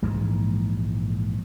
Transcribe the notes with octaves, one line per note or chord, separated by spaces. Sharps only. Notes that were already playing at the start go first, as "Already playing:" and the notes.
A#1 G#2 E3 G#3